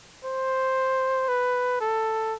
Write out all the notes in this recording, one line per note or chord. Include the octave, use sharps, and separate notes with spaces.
C5
B4
A4